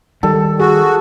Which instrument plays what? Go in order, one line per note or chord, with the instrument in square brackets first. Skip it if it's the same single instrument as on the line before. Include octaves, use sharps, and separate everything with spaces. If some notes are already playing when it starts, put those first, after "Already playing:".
[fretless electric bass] D#3 G3 [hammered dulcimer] A4
[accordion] F#4 [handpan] G#4